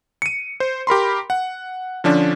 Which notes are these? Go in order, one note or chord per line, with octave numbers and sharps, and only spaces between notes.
C#7 D#7
C5
G4 A#4 B5 C6
F#5
D3 F3 C#4 D4